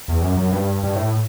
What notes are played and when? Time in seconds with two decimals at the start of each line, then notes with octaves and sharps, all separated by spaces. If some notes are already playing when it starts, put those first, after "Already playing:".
0.08 E2
0.22 F#2
0.36 F#2
0.52 G2
0.84 G2
0.95 A2